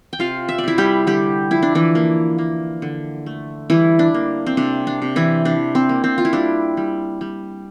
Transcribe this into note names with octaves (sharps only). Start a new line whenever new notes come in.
G5
C3 F4 F5
E5
D5
C3 E4 E5
G3 G4
D3 G3 G4
F3 E4
D4
E3 E4
A#3
A#3
D3
A3
E3 G3 E4
D4
A#3
C4
C3 D4
D4
C3
E3 E4
C3 D4
C4
A#3
C4
F4
E4
G3 D4
G3
G3